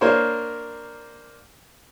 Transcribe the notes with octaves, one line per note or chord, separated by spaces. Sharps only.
A#3 D4 A#4 C5 C#5